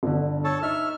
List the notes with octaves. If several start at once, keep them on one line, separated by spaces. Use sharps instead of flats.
G1 D3
A4 C#5 A5
D#4 E5 F6